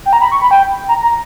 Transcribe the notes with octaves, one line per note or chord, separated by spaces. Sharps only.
G5
A#5
B5
C#6
B5
G5
A#5
A#5